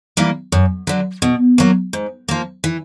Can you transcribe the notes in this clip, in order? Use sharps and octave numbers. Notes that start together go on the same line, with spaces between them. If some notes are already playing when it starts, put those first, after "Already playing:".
E3 G3 A#3
F#2
D3 F#3
B2
F#3 A#3
G#2
F3 A#3
E3